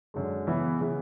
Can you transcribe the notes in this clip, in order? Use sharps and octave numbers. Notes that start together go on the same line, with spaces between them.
F#2 D3 G#3
C#3 E3 B3 E4
C#3 E3 B3 E4